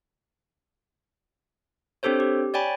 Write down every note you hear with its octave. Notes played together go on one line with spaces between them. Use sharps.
C4 D4 G4 A4 C5 C#5
G4
C#5 D5 G5 G#5 B5